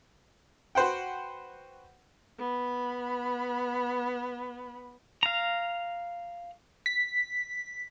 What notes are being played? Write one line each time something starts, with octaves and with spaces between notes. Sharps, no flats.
F#4 B4 C5 F#5 G5
B3 B5
F5 A#5
B6